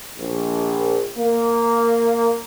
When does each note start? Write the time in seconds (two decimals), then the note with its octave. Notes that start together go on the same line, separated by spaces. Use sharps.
0.19 A#1
1.17 A#3